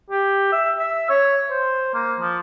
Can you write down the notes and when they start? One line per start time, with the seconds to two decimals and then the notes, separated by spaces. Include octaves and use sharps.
0.10 G4
0.52 E5
0.78 E5
1.09 C#5
1.51 C5
1.94 A#3
2.20 F3